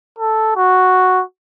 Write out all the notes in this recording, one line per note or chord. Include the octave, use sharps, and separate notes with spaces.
A4
F#4